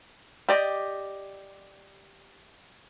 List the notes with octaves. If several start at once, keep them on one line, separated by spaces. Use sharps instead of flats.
G4 D5 D#5